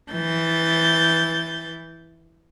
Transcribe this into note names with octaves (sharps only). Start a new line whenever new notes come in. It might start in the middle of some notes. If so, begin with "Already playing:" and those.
E3 G6 A6